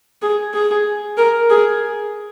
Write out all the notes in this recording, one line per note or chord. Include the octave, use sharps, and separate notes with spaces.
G#4
G#4
A#4
G#4